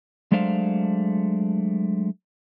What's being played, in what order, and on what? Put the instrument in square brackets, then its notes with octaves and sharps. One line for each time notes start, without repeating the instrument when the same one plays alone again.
[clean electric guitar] F#3 G#3 A3 D4 C5 F5